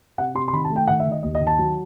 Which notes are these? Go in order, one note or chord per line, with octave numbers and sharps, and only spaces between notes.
C3 F#5
C3 C6
C6
D#3 B5
A5
A3
G5
D#3 F#5
E5
D#3
D#5
D#2 D#5
D#5
D#3
A5
F#3